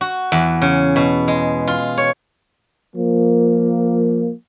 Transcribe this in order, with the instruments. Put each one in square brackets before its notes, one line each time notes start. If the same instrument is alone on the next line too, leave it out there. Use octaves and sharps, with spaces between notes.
[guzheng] F#4
E2
C#3
B2
G#3
F4
C#5
[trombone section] F3 A#3